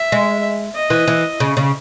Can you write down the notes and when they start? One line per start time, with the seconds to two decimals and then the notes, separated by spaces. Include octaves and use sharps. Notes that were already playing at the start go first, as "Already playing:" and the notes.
Already playing: E5
0.12 G#3
0.75 D#5
0.90 E3
1.07 E3
1.40 C#3
1.57 C#3